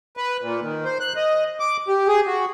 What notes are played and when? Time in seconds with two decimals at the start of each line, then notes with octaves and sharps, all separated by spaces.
0.17 B4
0.42 A#2
0.62 D#3
0.85 C5
1.00 F#6
1.16 D#5
1.60 D6
1.88 G4
2.08 G#4
2.27 F#4